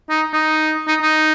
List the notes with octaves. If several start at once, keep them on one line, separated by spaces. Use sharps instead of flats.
D#4
D#4
D#4
D#4